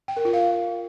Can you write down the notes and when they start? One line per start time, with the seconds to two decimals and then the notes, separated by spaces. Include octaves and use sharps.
0.08 G5
0.17 A#4
0.25 F4
0.33 F5